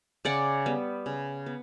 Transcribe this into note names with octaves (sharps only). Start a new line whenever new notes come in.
C#3 D5 F#5
G3 B3
C#3
B3